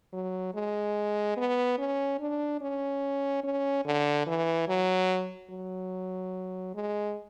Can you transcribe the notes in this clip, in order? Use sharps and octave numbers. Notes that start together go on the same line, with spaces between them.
F#3
G#3
B3
C#4
D4
C#4
C#4
D3
E3
F#3
F#3
G#3